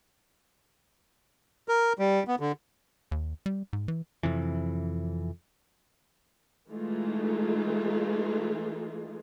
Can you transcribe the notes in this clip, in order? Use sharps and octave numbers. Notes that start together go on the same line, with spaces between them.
A#4
G3
B3
D3
D#2
G3
G#2
E3
F2 C3 E3
E3 G#3 A3 D#4 F4 G#4